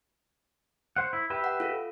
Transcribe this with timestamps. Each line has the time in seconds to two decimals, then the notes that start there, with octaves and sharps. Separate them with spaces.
0.96 C5 F#5
1.13 E4
1.30 G4 B4 E5
1.44 F#5
1.60 F4 A4